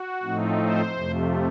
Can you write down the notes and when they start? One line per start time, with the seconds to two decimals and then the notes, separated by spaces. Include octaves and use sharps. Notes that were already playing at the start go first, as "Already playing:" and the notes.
Already playing: F#4
0.23 A2 F3 A3 C4 D#4
0.60 C5
0.96 F2 C3 F3 A3